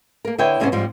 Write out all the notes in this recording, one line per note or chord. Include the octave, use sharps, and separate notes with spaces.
A#3 A#4
D3 E4 B4 C#5 D#5 G5
D#2 G#2 C3 B3 C#4 C5
G#2 F3 G3 C4